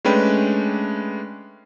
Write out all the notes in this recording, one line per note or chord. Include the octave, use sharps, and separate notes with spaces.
G#3 A3 C#4 D4 B4 G5